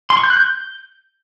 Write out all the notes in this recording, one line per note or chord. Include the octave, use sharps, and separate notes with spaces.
C6
C#6
G6
F#6
G6